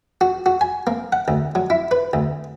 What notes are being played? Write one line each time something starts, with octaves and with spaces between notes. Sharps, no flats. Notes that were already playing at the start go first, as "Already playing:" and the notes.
F#4
F#4
G#5
A#3
F#5
D2
F#3
E4
B4
D2